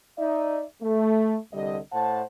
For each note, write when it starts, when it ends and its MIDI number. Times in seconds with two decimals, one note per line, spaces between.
0.19 0.64 63
0.19 0.64 74
0.19 0.64 76
0.82 1.37 57
1.53 1.79 36
1.53 1.79 50
1.53 1.79 55
1.53 1.79 75
1.92 2.22 45
1.92 2.22 72
1.92 2.22 78
1.92 2.22 81